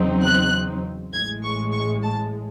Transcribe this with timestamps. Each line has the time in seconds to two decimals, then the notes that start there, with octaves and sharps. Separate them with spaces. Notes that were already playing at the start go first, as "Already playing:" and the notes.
Already playing: E2 C#3 F#3 C4 D#4
0.23 F#6
1.13 A1 A2 G#3 G#6
1.43 C#6
1.73 C#6
2.03 A5